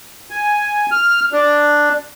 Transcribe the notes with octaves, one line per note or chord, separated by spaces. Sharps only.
G#5
F6
D4